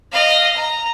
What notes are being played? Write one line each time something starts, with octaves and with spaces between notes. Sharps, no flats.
D#5 F5
A#5